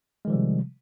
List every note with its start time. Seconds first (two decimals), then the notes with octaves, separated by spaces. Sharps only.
0.25 G#3
0.27 D#3
0.30 F3
0.32 G3
0.35 C3